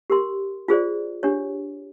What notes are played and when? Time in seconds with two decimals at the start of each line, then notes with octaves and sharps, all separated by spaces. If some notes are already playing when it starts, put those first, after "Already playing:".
0.10 G4 A#4 C6
0.68 F4 G#4 C5 D5
1.23 D4 G4 C#5